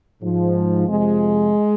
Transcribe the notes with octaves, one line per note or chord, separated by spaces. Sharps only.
G#2 F3
F2 C3 F3 G#3